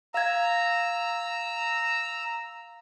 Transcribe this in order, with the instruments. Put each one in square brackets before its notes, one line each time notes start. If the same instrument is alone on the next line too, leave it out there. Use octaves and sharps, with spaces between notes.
[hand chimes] F5 G#6 [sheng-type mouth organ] A#5 E6